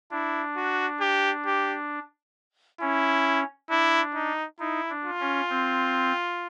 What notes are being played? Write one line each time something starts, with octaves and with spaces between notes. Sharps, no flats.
D4 E4
F#4
G4
G4
C#4 E4
D4 E4
D#4
D#4 E4
D4
F4
C#4
C4